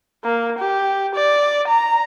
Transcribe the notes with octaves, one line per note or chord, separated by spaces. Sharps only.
A#3
G4
D5
A#5